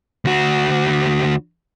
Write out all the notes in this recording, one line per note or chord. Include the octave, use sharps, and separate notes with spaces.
D2 F#4